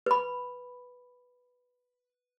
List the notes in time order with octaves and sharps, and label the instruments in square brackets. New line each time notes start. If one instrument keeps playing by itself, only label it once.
[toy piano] B4 B5